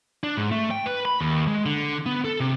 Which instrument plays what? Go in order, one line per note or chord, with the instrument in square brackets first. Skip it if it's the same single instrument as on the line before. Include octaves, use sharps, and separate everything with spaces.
[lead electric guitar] D4
G#2
A3
G5
B4
B5
D#2
G#3
D3
B3
A4
C3